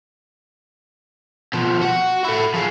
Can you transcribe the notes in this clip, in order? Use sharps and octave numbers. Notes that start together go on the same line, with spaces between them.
B2 F3
F#4 F#5
E4 A4
F3 G#4